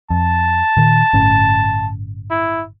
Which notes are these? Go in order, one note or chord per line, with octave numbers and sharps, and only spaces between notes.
F2 A5
A#2 D#3
G1 A2 C#4
E4